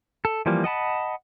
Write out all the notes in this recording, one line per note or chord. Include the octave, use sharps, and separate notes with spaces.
A4
E3 F3 G3 A#3
D#5 F#5 A5 B5